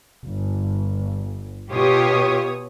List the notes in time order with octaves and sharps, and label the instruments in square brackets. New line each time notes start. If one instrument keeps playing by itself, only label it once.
[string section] G1
[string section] B2 C#5 D#6 [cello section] F4 G4